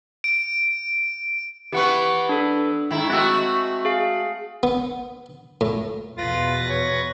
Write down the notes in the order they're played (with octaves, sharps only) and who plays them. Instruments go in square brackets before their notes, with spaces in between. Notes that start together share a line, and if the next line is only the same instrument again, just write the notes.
[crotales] D7
[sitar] E3 B3 B4 [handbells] G4 F#5 C#6
[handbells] D4 A4
[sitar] G#2 D#3 E4
[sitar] G#3 A3 F#4 [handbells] C4 E6
[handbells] G#4 F5
[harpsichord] B3
A2
[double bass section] E2 B2 [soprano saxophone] F4 [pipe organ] B4 A6 A#6
[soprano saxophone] C#5